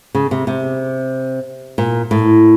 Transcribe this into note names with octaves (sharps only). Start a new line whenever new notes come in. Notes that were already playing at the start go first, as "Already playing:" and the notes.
C#3
C3
C3
A#2
A2